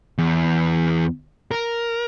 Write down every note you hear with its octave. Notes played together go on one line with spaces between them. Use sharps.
E2
A#4